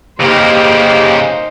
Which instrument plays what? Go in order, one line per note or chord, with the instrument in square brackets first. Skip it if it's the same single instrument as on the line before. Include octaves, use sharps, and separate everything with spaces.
[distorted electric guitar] C#3 A#4 [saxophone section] A#3 G4 [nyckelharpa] D#4 C5